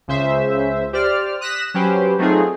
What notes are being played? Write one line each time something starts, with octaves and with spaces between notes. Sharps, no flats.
C#2 C#3 C5 E5
G4 C5 D5 F6
D#6 F#6 A#6 B6 E7
F#3 C#4 G4 B4 C5
F#3 A3 C4 D#4 F4 G#4